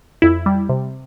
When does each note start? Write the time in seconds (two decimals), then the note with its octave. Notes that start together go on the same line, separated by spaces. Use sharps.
0.22 F2 E4
0.46 G3
0.69 C3